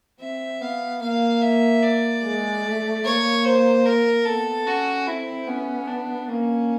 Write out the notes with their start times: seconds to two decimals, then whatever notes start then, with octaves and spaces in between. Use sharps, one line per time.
0.20 C4 E5
0.61 B3 F5
1.01 A#3 F5
1.42 E5
1.83 D5
2.23 G#3
2.63 A3
3.04 A#3 C#5
3.44 C5
3.86 A#4
4.25 B3 A4
4.66 C#4 F#4
5.07 C4 E4
5.47 B3 C#4
5.87 D4
6.28 A#3 C#4